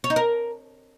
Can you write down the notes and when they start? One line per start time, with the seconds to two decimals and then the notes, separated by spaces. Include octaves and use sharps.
0.04 C#5
0.10 D#4
0.16 A#4